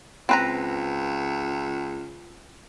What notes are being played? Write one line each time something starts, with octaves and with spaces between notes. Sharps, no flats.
C#2 C4 B4 A#5